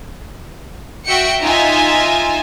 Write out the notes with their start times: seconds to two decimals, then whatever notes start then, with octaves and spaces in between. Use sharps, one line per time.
1.05 F#4 E5 G5 C#7
1.42 D#4 F4 E5 G#5